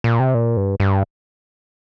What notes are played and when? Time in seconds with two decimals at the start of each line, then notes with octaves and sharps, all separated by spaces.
0.04 A#2
0.20 C3
0.35 A#2
0.57 G2
0.80 G2